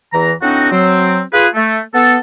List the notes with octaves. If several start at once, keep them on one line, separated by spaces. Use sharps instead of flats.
E2 E3 B4 A#5
A2 C4 D4 D#4 F#4
F#3 C4
F4 G#4 B4
A3
B3 A4